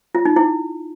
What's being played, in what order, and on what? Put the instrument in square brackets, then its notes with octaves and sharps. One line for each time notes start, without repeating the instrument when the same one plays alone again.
[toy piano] F4
D#4
E4